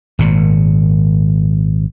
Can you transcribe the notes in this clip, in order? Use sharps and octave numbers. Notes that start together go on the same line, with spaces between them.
G#1 A#2